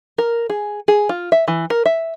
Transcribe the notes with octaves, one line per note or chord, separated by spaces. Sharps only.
A#4
G#4
G#4
F4
E5
E3
A#4
E5